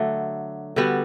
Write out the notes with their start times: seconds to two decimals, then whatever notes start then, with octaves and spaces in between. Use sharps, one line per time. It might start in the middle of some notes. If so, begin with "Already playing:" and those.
Already playing: D3 F#3 A3
0.76 D3 G3 B3 F#4